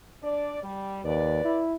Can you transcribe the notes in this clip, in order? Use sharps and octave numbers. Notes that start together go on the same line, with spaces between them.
D4 D5
G3
D#2 B4 D5
E4